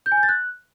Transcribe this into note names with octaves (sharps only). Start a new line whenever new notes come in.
G6
G#5
G6
A6
F#6